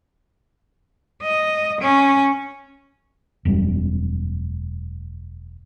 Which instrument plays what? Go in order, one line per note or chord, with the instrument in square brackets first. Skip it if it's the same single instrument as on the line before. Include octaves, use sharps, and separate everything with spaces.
[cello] D#5
C#4
[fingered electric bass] E1 F#2 G3